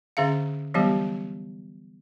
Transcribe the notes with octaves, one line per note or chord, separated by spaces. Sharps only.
D3 C#4 G#4 E5 F5
E3 F#3 G3 B3 G4